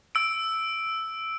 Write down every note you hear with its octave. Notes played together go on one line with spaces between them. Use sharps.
E6 D7